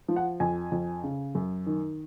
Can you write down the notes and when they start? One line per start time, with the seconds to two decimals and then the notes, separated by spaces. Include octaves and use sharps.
0.08 F3
0.16 F#5
0.40 F2 G#5
0.72 F2
1.03 C#3
1.35 F#2
1.66 D#3